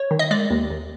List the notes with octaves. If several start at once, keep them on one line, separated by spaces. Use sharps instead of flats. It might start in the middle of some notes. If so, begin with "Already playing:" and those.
Already playing: C#5
D#3
D#5
G#3 D5
D#2
D#2